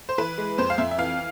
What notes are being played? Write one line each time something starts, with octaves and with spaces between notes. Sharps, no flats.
C5
E3 B4
G#3
F2 C5
F5
F2 E5
E5
E3 F5